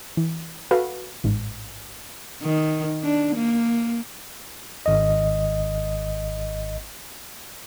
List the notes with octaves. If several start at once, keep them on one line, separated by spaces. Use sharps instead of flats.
E3
F#4 A4 B4 F5
A1 G#2
D#3
D4
A#3
G#1 D#5